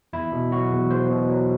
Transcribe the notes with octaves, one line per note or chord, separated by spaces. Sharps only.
E2 E4
B2
F#3 F#4
E2
E2 C5
B2
F#3